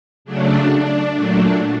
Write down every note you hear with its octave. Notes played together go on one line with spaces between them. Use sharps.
C#3 F#3 A3 D4
D4
A#2 F#3 A3 D4